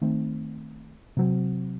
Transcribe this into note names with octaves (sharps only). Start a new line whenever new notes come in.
D#3 A3 C4
C3 F#3 C4